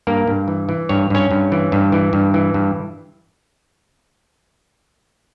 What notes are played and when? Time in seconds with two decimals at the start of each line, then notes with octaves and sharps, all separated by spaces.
0.07 G2 A#3 A#4
0.28 G2
0.48 E3
0.69 E3
0.89 G2 C#5
1.10 G2 C#4 C#5
1.31 G2
1.52 E3
1.72 G2
1.92 E3
2.13 G2
2.34 E3
2.54 G2